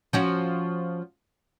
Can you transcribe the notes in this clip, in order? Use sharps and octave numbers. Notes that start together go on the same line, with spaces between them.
F3 C#4 F#4